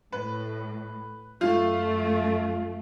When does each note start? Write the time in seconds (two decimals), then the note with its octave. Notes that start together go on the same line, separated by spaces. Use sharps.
0.12 A2 B4
1.41 F#2 A3 F4